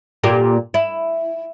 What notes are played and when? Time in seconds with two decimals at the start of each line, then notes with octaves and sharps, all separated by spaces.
0.24 A#2 A#3 G4
0.74 E4